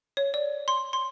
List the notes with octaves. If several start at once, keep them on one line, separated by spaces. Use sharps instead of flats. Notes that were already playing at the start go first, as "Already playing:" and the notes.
C#5
D5
C6
C6